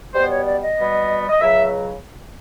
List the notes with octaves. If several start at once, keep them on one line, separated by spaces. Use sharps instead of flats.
B2 G3 B3 C5
C#5
D5
D#5
B2 G3 B3
D#5
C#2 C#3 F#3 E5